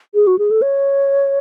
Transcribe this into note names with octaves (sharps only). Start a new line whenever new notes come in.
G#4
F#4
G#4
A4
C#5